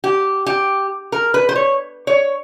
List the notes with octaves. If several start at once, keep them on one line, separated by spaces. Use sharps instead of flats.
G4
G4
A#4
B4
C5
C#5
C#5